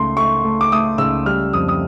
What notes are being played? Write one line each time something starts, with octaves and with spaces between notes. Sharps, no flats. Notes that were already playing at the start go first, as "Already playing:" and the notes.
Already playing: C#2 A3 C6
A3 C#6
A3
D6
A3 D#6
C#2 E6
G3 F6
F2 D#6
D#6